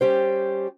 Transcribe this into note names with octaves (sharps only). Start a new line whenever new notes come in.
G3 C#4 G4 C5